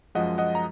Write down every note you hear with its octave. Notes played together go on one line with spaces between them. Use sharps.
F#2 F3 G#3 D#5 F#5
D#5 F#5
A#5